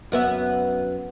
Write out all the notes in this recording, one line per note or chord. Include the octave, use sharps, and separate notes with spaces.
F#2 B3 E5